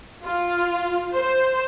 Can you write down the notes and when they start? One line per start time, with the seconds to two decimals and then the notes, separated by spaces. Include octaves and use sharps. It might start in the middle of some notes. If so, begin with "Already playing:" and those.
0.25 F4
1.14 C5